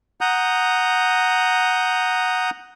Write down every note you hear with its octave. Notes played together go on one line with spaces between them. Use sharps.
F#5 A#5 D#6 G6